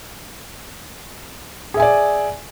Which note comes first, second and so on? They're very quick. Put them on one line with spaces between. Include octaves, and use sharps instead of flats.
G#4 E5 G#5 D5